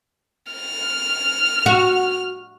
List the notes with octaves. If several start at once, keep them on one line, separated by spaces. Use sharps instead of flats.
F6
F#4